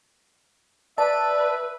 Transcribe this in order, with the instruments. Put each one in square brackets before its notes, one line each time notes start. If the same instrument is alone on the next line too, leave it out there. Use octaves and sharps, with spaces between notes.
[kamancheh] B4 [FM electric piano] D5 A5 [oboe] E5